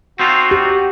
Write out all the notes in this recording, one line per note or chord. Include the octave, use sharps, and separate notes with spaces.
C4 D#4 F4 F#4
G4